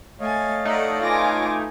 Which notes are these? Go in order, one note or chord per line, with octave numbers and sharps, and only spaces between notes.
A3 C#5 D#5 F5 G#5 A6
A3 D#4 D5 F#5
B3 F4 G#5 D6 A#6